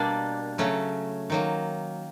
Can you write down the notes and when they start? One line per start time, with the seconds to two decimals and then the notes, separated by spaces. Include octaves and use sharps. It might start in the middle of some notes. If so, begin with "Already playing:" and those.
Already playing: B2 G3 A#3 D4
0.58 C#3 F#3 A3 C#4
1.30 D#3 F#3 A#3